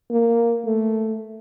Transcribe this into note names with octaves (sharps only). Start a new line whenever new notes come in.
A#3
A3